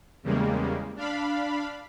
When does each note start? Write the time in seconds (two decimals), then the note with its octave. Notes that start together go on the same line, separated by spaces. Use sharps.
0.23 E2 C#3 G3 G#3 A#3
0.96 D4 F5 B5